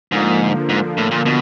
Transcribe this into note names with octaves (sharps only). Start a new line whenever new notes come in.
G#2 D3 F3 A#3
G#2
A2
A#2
B2